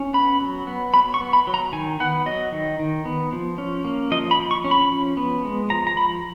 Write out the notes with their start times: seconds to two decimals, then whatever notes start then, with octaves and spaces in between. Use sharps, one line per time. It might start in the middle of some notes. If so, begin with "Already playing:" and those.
Already playing: C#4
0.13 B3 B5
0.41 F#3
0.67 B3
0.94 F#3 B5
1.14 C#6
1.21 B3
1.33 B5
1.47 F#3
1.54 A#5
1.72 D#3 G#5
2.00 B3 F#5
2.26 F#3 D#5
2.52 D#3
2.79 D#3
3.05 B3
3.33 F3
3.58 C#4
3.85 A#3
4.11 F3 D#5
4.31 B5
4.39 F3
4.51 C#6
4.64 C#4
4.71 B5
4.92 F3
5.17 B3
5.45 G#3
5.70 F3 A#5
5.87 A#5
5.97 F3 B5